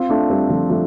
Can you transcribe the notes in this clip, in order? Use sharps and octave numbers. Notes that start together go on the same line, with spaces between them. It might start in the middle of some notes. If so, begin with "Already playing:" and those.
Already playing: C4 F4
A3 D4
G3 C4
F3 A3
F3 A3